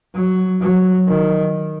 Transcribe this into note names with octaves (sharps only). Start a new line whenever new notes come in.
F#3
F#3
D#3